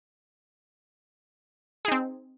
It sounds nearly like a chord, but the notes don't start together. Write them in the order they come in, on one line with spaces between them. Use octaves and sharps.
G#4 D#4 C4